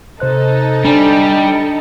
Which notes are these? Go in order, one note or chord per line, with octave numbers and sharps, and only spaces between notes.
C3 D#4 A4 C5 F#6
G3 D4 D5 G#5 A#5
C#7